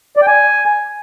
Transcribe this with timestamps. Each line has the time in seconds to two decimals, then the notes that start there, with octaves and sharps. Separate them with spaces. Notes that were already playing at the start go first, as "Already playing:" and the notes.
0.17 D5
0.22 G5
0.27 G#5